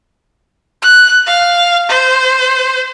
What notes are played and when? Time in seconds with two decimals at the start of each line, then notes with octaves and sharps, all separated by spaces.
0.82 F#6
1.27 F5
1.89 C5